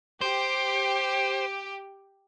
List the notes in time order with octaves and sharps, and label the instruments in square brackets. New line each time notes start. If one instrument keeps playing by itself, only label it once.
[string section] G4 [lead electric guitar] C5